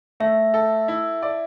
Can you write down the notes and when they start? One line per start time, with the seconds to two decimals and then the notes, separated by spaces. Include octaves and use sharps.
0.20 A3 E5
0.54 A4
0.88 E4
1.22 D5